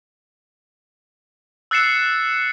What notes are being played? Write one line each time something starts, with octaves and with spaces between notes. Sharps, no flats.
E6 F#6 A6 C7 C#7 E7